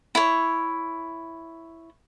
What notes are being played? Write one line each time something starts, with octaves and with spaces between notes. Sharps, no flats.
E4 C#5